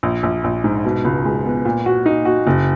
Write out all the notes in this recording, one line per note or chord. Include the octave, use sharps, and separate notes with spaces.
A#1
A#1
A#1
G#2
B2
C#2
G#3
B3
A#2
F#4
D#4
F#4
F#1